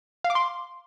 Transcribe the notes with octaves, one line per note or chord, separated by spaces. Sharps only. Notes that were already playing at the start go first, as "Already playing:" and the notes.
F5
D6
C6